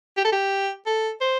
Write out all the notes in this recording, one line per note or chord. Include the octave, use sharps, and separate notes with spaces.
G4
A4
G4
A4
C5